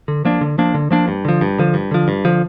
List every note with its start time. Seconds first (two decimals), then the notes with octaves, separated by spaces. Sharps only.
0.08 D3
0.25 F3 A#3 D4
0.41 D3
0.58 F3 A#3 D4
0.74 D3
0.91 F3 A#3 D4
1.08 G2
1.25 D3 F3
1.41 G2
1.58 D3 F3
1.74 G2
1.91 D3 F3
2.08 G2
2.25 D3 F3